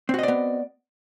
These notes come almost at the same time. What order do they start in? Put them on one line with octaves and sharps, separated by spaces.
C4 F#4 D#5 D5 B3